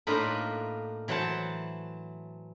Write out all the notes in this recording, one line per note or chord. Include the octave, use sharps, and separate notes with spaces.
A2 A#3 D4 D#4 F4 B4
E3 F#3 C5 F#5 A5